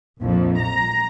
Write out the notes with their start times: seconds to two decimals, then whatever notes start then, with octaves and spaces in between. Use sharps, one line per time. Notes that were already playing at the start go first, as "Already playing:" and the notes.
0.21 A#1 F2
0.60 A#5